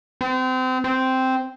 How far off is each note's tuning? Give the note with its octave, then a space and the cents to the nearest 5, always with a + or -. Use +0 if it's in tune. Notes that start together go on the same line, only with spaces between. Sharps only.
C4 -30
C4 -5